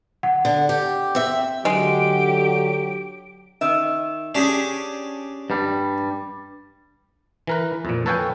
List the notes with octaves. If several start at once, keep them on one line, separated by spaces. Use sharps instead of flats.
F#5
D3
G4
C4 E5
D3 F#3 G#3 G4 D7
D#3 E5
C#4 D4 G4 G#4
G2 G3
E3 A#4 B4
F2 A#2
A4 B4 C#5 F5 G5 G#5